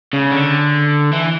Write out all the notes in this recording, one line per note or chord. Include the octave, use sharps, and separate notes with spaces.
C#3
D3
E3